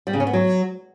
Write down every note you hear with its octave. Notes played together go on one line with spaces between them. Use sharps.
G3
C#3
C#4
B3
F#3